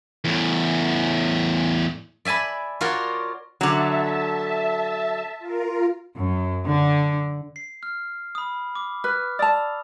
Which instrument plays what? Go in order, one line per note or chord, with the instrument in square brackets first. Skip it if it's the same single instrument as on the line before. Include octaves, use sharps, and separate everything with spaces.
[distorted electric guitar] E2 A2
[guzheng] D5 E5 G#5 A5 B5
F4 F#4 A#4 C#5 D5
[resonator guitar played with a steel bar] D3 F#3 [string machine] E5 A5
[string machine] F4 A#4
[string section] F#2
D3
[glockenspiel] C7
F6
B5 D#6
D6 D#6
[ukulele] B4 [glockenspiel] F6
[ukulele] D5 A5 [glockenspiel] D#6 E6 F7